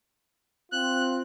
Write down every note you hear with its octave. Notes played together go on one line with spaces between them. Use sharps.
C4 F4 F#6